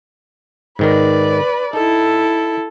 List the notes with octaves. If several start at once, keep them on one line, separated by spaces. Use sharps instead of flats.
G#2 D#3 A#4 B4 D5
D#4 E4 A4